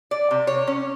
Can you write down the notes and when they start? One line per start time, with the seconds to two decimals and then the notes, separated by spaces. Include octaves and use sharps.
0.11 D5
0.31 C3
0.47 C#5
0.67 C#4